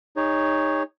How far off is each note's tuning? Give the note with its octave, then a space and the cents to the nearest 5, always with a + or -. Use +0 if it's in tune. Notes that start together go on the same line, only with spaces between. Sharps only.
D#4 +0 G#4 -45 C#5 +0